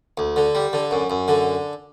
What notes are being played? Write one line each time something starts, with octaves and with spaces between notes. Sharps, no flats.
D2
D3
G3
D3
F#2
F#2
D3